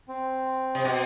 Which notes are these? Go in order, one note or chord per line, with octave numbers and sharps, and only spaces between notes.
C4
C3
B2